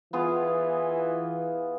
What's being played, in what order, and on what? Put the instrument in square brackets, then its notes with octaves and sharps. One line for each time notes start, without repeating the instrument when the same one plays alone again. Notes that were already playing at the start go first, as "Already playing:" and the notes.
[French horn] E3 [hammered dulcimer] B3 F4 G#4